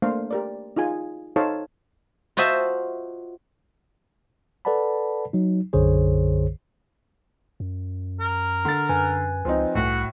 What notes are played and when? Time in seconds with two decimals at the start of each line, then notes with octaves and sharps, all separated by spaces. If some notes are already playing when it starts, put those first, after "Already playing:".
0.02 A3 A#3 D4 C5 F5
0.31 G4 A#4 D5
0.77 D#4 F4 G#4 G#5
1.36 D#4 A4 C5 C#5 F5 A5
2.37 F4 F#4 C5 D#5 E5 A5
4.65 A4 B4 D5 F#5 A5 B5
5.33 F#3 D#4
5.73 B1 F#2 D3 G#4 C5 C#5
7.60 F#2
8.20 A#4
8.65 D3 A6
8.89 F#2 B4 G#5
9.45 C#2 F3 C4 D#4
9.75 C2 A2 F#4